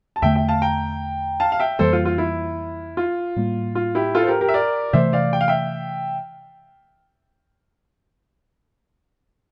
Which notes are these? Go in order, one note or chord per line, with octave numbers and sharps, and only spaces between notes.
A5
E2 D3 A3 E5 G5
E5 G5
F5 A5
G5 A#5
F5 A5
F5
E5 G5
F2 E3 G3 A#3 A4 C5
F4
F4
E4
F4
A2 G3 A#3
F4
E4 G4
F4 A4
C5
G4 A#4
G4 A#4
E5
A#4 D5
C3 E3 A3 C5 E5
D5 F5
G5
F5
E5 G5